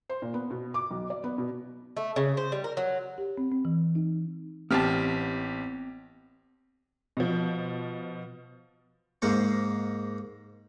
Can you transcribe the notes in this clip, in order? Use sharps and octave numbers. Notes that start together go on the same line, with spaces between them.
C5
A#2
B3
B2
D6
B1
D5
B3
B2
A3
C#3
C5
G3
A#4
F#3
G4
C4
C4
E3
D#4
A1 B3 C4 G4 A5 F6
B2 F3
G#2 A#3 C5 C#6